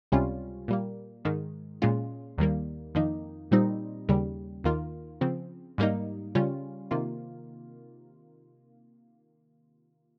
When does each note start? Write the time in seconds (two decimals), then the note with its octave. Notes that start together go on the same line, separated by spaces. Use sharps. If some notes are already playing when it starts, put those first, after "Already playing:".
0.12 C#2 C3 G3 C#4 F4
0.68 A#2 G3 A#3
1.25 G#2 D#3 G#3
1.82 A#2 G#3 C#4 F4
2.38 D#2 D#3 G3 A#3
2.95 F2 D#3 A#3 D#4
3.51 A#2 G3 C4 D#4
4.08 D#2 C#3 G3
4.64 D#2 D#3 A#3 F4
5.21 C#3 F3 C4
5.78 G#2 G3 A#3 D#4
6.35 C#3 G3 C#4 F4
6.91 C3 D#3 A#3 F4